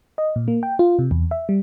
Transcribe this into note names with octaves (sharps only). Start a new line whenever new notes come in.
D#5
A#2
A#3
G5
F4
C3
E2
E5
G3